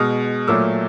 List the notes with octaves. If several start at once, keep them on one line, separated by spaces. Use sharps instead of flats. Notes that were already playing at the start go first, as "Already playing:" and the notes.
Already playing: B2 G#3 D#6 F6
A#2 F#3 A3 D6 E6